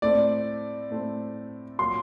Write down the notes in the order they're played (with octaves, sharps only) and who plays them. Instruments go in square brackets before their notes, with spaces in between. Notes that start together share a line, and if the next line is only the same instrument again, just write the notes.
[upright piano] A2 A3 C4 [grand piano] D5
[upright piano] A2 A3 C4
[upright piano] A#2 F#3 A#3 [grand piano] C6